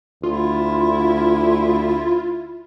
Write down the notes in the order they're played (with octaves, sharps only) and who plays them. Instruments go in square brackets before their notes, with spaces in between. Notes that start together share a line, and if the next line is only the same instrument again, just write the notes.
[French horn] D2 [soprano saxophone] E4 [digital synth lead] F4